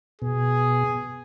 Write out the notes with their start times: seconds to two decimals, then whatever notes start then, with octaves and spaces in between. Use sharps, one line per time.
0.22 B2 G#4